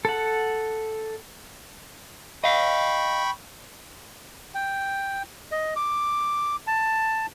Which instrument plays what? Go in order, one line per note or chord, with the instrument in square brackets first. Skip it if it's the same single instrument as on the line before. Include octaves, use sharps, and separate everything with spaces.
[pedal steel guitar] A4 F#5
[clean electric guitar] D#5 F5 [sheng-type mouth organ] G5 B5 C#6
[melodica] G5
D#5
D6
A5